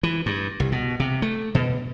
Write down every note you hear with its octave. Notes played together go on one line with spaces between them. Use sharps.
E3
G2
C2
B2
C3
A3
B2